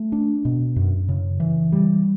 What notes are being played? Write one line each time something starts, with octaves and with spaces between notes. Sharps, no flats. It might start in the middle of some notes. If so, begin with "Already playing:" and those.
Already playing: A3
D4
B2
F#2
C#3
E3
G3